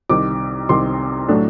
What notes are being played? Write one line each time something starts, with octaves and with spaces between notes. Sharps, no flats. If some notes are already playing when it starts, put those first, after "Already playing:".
C2 C3 D#3 D6
C2 C3 D#3 C6
A2 F#3 A3 D4